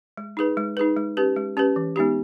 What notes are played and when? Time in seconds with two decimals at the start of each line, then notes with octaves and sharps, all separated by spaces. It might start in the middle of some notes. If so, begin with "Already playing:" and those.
0.17 G#3
0.37 D#4 G#4 B4
0.57 G#3
0.77 D#4 G#4 B4
0.97 G#3
1.17 C#4 G4 B4
1.36 G#3
1.57 C#4 G4 B4
1.76 E3
1.96 G#3 B3 D#4 G4